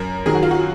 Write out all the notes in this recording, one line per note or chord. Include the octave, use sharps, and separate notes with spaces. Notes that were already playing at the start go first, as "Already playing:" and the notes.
Already playing: F#2 A#4
D#3 F#3 G#4
F#4
F4
F#4